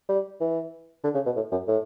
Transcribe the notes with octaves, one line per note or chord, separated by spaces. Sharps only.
G3
E3
D3
C#3
B2
A2
F#2
A2